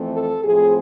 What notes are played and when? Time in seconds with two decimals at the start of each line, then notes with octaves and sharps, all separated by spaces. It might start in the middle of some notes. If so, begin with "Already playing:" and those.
Already playing: F2 E3 A3 C4
0.14 A4
0.43 A2 F3 A3 C4 G#4